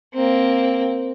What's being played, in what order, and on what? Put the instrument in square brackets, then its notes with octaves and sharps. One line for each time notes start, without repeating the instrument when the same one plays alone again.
[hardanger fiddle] A#3 C4